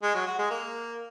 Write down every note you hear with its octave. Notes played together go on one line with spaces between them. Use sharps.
G#3
F#3
F#4
G#3
A#3